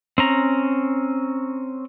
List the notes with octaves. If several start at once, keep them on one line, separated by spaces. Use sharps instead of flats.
C4 C#4 A#5